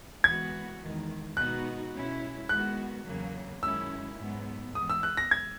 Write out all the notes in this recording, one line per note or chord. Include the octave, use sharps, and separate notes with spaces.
E3 G#3 B3 F#4 G#6
E2 D#3 G#3
B2 G#3 B3 D#4 F#4 F#6
B2 G#3 C#4 E4
D#3 G#3 B3 F#4 F#6
E2 C#3 F#3 A#3
F#2 D#3 G#3 C#4 E4 E6
G#2 F#3 B3
E3 G#3 B3 D#6
E6
F#6
A#6
G#6